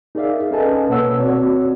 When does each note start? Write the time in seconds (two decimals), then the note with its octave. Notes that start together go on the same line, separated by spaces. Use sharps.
0.15 D#4 G#4 A#4 D5 E5 F5
0.51 C#4 A4 B4 D#5 G#5 A5
0.89 B2 A#3 B4 C#5 F#5 E6
1.20 C4 F#4 C#5 D5